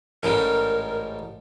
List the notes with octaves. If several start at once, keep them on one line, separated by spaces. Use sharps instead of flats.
A1 G#2 G3 A#4